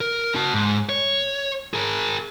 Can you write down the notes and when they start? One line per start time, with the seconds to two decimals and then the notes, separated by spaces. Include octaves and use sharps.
0.01 A#4
0.36 F#4 A5
0.54 G#2
0.89 C#5
1.74 G#4 A#4